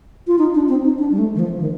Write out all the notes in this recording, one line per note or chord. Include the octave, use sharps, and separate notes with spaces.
F4
D#4
D4
C4
D#4
D4
G3
A3
D#3
F3
D#3